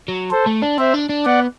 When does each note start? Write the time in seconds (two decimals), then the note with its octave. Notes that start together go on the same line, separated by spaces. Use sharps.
0.08 F#3
0.31 A4 C5
0.47 A3
0.62 D4
0.78 C4 C5 E5
0.94 D4
1.09 D4
1.26 B3 D5 F#5